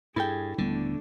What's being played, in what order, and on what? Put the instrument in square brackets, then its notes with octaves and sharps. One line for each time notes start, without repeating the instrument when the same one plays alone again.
[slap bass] G2 [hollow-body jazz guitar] E4 A4 G5 [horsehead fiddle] G#4
[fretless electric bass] D#1 G3 B3 [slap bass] D3 [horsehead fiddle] A3 D4